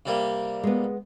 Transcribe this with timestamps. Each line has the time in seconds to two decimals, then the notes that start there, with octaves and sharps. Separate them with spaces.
0.06 C3 G3 A#3
0.63 G#3 B3